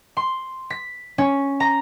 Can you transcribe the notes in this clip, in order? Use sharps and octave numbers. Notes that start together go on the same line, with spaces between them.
C6
B6
C#4
A#5